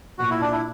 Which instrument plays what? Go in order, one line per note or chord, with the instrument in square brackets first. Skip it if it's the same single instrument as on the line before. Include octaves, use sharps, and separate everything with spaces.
[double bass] A#2 [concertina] F#4
[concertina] E4
D4
E4